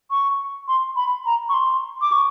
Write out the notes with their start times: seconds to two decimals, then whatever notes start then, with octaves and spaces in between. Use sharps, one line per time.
0.11 C#6
0.68 C6
0.96 B5
1.26 A#5
1.49 C#6
1.54 C6
2.01 D6
2.12 C#6